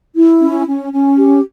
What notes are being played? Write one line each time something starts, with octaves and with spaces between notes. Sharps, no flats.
E4
C#4
C#4
C#4
G4